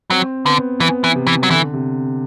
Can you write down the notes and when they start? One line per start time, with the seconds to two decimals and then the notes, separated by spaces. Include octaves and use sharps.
0.10 F#3 C4
0.45 D3 B3
0.80 E3 B3
1.04 E3
1.15 C3
1.27 E3
1.43 F#3
1.50 D3 E3
1.73 C3